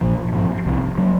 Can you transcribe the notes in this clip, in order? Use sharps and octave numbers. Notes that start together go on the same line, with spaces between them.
A#1 A#2 F3
G#2 F3 C4
C2 C3 F3
F#3 A#3 C#4